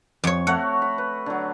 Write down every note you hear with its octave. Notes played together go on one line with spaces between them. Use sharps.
F2 C#5
A3 F#4 C#5 F#5
B5
B4
D3 F#3